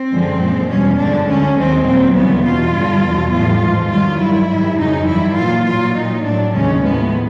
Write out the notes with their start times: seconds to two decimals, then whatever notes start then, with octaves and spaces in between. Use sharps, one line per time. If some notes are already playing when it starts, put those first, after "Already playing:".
Already playing: C4
0.12 F#2 D3 F3 G#3
0.41 A#2 F3 G#3
0.70 E2 B2 G3 C#4
0.99 G2 D3 F3 G#3 D4
1.28 D2 D3 F#3 C#4
1.57 D#2 D#3 G#3 C4
1.87 A#2 F#3 C4
2.16 D2 C#3 E3 G3 B3
2.45 E2 B2 F#3 F4
2.74 G2 D3 G3
3.03 E2 B2 F#3
3.33 A2 E3 G3 F4
3.62 G#2 F3 G#3
3.91 G2 D#3 F#3 F4
4.20 G2 D#3 F#3 E4
4.49 G#2 D#3 G3
4.78 F2 C#3 F#3 D#4
5.08 G2 E3 G3 E4
5.37 A#2 F#3 F4
5.66 A#2 F#3 F4
5.95 A#2 F#3 D#4
6.24 A2 F#3 D4
6.54 D#2 C#3 E3 G#3 C#4
6.83 A2 F3 G#3 B3